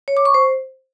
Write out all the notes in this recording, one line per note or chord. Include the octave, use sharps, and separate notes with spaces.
C#5
D6
C#6
C5